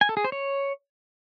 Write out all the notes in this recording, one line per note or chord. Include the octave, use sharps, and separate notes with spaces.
G#5
A4
G#4
C5
C#5